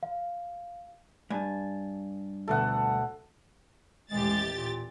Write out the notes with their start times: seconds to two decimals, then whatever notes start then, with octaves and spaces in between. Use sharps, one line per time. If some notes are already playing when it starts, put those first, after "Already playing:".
0.03 F5
1.30 G2 G#5 A5
2.48 D2 B2 A4 F#5
4.11 A1 D#2 G#3 G4 A6
4.49 A#2